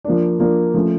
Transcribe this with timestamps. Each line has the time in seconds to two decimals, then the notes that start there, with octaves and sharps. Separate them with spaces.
0.04 F3 A#3 D4
0.40 F3 A#3 D4
0.74 F3 A3 C#4